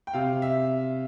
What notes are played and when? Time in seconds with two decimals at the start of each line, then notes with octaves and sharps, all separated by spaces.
0.07 G5
0.14 C3 F5
0.42 E5